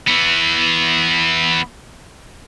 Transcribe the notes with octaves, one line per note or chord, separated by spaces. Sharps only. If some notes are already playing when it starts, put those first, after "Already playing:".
E3 B3